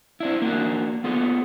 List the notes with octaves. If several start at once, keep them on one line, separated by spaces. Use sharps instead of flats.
C4 D4 E4
A#3 D4 F#4
B3 F4 G#4 A4